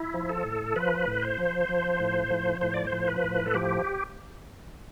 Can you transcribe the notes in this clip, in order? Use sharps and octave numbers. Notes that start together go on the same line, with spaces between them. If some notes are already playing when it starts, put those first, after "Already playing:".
Already playing: E4
F3
A4
A2
F3 B4
A2
C5
F3
F3
A2
F3
A2 C5
D5
C5
F3
B4
A2
A4
F3 G4